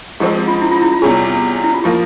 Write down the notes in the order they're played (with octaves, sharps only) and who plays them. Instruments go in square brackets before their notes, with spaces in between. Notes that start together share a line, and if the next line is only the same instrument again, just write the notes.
[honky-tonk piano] G#2 F3 G#3 C4 [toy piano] G4
[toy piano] F4
E4
F4
E4
F4
[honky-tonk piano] E2 C3 G3 C#4 [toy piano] G#4
[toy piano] E4
F4
[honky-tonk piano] F3 A#3 [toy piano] G4